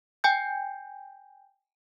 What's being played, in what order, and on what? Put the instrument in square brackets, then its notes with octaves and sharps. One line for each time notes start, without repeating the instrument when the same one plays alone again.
[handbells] G5 G#5 G6